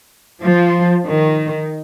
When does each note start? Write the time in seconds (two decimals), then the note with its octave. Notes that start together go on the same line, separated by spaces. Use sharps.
0.42 F3
1.08 D#3